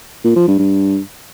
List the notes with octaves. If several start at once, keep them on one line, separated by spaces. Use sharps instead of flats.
A#2
F3
G2
G2